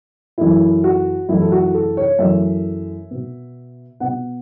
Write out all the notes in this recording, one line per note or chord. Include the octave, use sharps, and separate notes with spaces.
F#2 E3 A3 E4
F#4
F#2 E3 A3 E4
A4
F#4
A4
C#5
F#2 E3 A3 E5
B2 B3
B2 B3 F#5